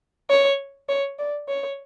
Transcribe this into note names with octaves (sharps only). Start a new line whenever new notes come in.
C#5
C#5
D5
C#5